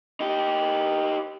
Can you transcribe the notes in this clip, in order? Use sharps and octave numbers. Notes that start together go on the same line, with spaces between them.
D#4 G4